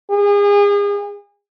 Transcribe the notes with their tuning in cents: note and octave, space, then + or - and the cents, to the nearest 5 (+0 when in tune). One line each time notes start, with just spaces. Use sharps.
G#4 -35